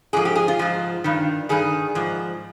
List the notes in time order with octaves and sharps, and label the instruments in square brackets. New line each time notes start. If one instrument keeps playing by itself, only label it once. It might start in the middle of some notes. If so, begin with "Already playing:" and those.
[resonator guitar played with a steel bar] G#2 F3 G#4
G4
G#4
F4
G#2 F3
G2 D#3
G2 D#3 G#4
G#2 F3